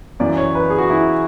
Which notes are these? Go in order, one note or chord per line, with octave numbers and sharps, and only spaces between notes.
F#2 E3 D5
C#5
B4
G#4
F#4
E4